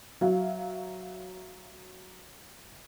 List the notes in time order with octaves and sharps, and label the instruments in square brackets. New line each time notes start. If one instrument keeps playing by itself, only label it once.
[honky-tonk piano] F#3 E5 F5